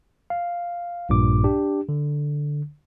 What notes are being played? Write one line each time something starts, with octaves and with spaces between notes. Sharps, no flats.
F5
A#1 G2 A#2 D6
D4 G4
D3